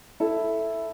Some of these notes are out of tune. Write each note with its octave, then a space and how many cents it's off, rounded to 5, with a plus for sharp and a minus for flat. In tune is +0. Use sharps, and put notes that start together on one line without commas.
E4 +0 A4 +0